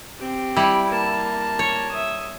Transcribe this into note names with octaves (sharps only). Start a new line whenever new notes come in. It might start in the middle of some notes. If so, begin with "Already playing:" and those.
C4 G4
G3 E4
A#3 A5
C#5
E5 D#6